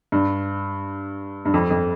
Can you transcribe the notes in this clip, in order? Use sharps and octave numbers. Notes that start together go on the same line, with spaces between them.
G2
G2
F2
F2